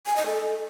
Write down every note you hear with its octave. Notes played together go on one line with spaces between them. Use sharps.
G#5
D#5
A4